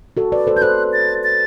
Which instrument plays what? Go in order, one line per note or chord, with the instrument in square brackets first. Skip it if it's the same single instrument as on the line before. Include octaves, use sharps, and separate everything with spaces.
[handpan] F#4 A4
B4 D5
A4 C5
[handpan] B4 [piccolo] G6
[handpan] A4 C5 [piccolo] F#6
[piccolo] A6
A6